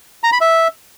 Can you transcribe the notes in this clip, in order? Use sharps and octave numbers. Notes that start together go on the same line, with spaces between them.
A#5
B5
E5